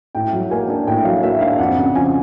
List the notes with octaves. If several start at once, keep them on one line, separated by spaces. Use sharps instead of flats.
A2 G5
F#3
A#3 G#5
D4
A2 G5
F#3 F5
A#3 E5
D4 F5
F2 F#5
C#3
F3 G#5